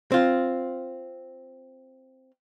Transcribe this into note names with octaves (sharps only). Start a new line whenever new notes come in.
C4 F4